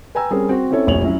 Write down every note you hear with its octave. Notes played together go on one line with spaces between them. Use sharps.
B4 G5 G#5 A#5 E6
G3 C4 C#4 G#4 A#4
C4 F#4
C4 C#4 E4 A4 C#5
F1 A#1 C#5 F7 F#7
F#3 C#4 E4